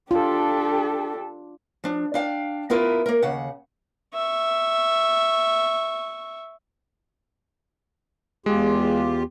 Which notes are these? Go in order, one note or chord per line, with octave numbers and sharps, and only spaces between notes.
D4 F4 G4 A4
F3 D4
D4 F5 G5
B3 E4 F4 A#4 B4
A#3 A#4
D#2 C#3 F#5
E5 C#6
E2 G#3 F4 G4